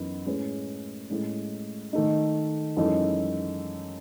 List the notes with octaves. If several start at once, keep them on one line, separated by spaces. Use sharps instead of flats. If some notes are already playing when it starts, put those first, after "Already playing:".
Already playing: F#2 E3 B3 D#4
A2 G#3 C#4 G#4 B4
A2 G#3 C#4
D#3 A3 D#4
F#2 E3 G#3 D#4 A4